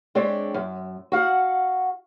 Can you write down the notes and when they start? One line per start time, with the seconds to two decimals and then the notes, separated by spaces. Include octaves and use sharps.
0.15 G#3 C4 D4 G4 C#5 D5
0.54 F#2
1.12 F#4 F5 F#5